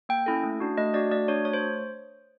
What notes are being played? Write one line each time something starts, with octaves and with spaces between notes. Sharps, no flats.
A#3 G5
C#4 E4 A4
A3
D4 F#4
A3 D#5
D4 F#4 D5
A3 D5
D4 F#4 C#5
A3 C#5
C5